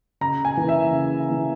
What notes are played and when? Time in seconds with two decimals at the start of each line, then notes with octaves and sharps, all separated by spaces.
0.21 C#3 A#5
0.45 G#5
0.57 E3 A#3
0.69 E5
0.92 C#3
1.28 E3 A#3